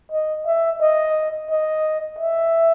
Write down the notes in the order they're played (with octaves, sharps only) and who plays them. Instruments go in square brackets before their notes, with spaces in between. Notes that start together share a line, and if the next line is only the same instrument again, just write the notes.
[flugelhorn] D#5
E5
D#5
D#5
E5